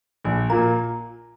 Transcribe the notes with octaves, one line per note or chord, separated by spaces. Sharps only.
A#1 G#5
A#2 A#3 A#5